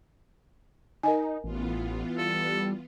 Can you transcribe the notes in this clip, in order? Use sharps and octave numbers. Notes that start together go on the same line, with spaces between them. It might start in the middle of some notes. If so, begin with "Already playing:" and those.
D#4 A#4 D#5 G#5
A1 E3 B3 F4
G3 A4